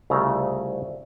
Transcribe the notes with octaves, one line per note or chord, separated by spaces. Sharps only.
C2 C#3 A3 E4 F4 A#5